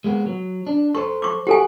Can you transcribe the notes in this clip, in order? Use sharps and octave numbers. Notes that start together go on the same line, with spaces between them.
G#3 A#3 B3
F#3
D4
A4 C5 C#6
C#6 D6
F#4 G4 A4 G#5